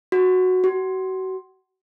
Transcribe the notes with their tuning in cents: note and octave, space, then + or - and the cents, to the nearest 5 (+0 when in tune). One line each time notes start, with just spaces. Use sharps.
F#4 -5
F#4 +30